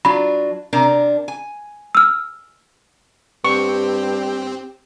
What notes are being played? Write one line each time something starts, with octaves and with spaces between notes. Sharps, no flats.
F#3 D4 F4 B5
C3 D4 A#4
G#5
E6 F6
G2 C4 G4 C#6